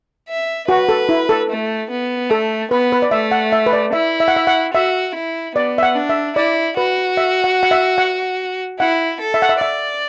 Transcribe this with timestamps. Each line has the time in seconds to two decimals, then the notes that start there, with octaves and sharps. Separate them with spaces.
0.28 E5
0.69 F#4 B4
0.89 A4
1.09 E4
1.29 A4
1.49 A3
1.91 B3
2.30 A3 A4
2.71 B3 B4
2.92 B4
3.02 D5
3.11 A3 E5
3.31 F#5
3.52 E5
3.66 B4
3.73 D5
3.93 E4 E5
4.20 E5
4.28 F#5
4.36 E5
4.47 F#5
4.74 F#4 E5
5.15 E4
5.55 B3 D5
5.78 E5
5.83 F#5
5.95 D4
6.09 E5
6.36 E4 D5
6.77 F#4 B4
7.17 E5
7.44 F#5
7.63 F#5
7.71 E5
7.98 F#5
8.79 E4 F#5
9.20 A4
9.34 E5
9.42 F#5
9.49 E5
9.61 D5 E5